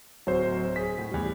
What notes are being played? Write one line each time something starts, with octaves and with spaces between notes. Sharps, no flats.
D1 F#3 C5
G#4 B6
A2
E2 G3